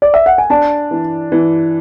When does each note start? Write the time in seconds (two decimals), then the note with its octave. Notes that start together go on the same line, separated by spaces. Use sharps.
0.02 D5
0.14 E5
0.26 F#5
0.38 G#5
0.50 D4 A5
0.91 E3
1.32 E3